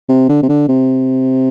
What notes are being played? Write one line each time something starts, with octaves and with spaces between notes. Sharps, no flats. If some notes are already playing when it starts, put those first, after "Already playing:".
C3
D3
C3
D3
C3